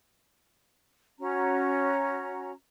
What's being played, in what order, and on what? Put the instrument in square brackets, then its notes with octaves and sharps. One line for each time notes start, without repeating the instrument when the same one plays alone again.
[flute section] C#4 F#4 A#5